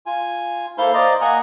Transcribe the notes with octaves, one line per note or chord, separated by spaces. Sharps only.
F4 G#5
A#3 E4 A4 C5 F5 C6
C5 D5 D#5 F5 A#5
A#3 D#5 F#5 G#5 A#5